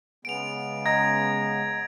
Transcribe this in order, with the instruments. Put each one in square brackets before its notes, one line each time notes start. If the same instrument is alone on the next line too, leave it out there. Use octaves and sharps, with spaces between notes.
[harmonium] C#3 G#3 B3 [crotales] D7 F7
[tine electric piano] D#5 A#5 [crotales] G#6 [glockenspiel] A#6